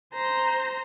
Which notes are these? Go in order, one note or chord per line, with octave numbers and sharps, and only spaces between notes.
C5 A#5